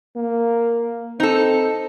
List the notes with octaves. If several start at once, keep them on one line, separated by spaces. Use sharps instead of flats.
A#3
C4 D#4 A4